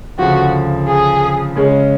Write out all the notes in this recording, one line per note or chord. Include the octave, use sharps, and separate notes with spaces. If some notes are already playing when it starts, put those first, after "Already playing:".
D2 C#3 F3 F#4
G#4
C#3 G#3 C#4